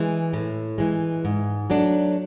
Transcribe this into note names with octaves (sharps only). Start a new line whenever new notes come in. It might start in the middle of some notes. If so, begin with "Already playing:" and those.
Already playing: E3 G#3
A2
E3 G#3
G#2
F#3 A3 D4